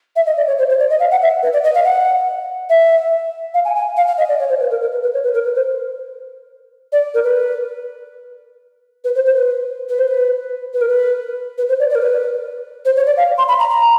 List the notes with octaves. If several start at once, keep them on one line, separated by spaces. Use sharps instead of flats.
E5
D#5
D5
C#5
C5
C5
D5
D#5
F5
F#5
E5
B4
D5
D#5
F5
F#5
E5
F5
G#5
G#5
F5
F5
D#5
D5
C#5
C5
B4
A#4
A#4
B4
B4
C#5
B4
A#4
B4
C5
D5
A#4
B4
B4
C5
C5
B4
B4
C5
B4
B4
A#4
B4
B4
C5
D5
D5
A#4
B4
C5
C#5
D5
F5
C6
B5
A#5
A#5